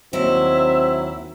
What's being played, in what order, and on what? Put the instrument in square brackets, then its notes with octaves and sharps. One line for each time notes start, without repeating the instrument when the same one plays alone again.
[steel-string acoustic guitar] D#2 E4 [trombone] F#3 [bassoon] C4 [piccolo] E5